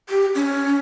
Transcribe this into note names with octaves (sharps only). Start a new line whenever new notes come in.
G4
C#4